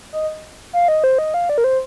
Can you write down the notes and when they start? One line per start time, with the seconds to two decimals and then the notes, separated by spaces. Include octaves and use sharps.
0.13 D#5
0.73 F5
0.88 D#5
1.04 C5
1.18 D#5
1.34 F5
1.49 D5
1.58 A#4
1.64 C5